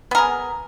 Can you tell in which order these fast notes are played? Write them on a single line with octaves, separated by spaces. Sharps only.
B3 A#4 G#4